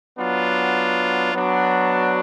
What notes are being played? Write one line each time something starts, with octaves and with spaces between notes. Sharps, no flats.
F#3 B3 D4 F4
F#3 B3 D4 F#4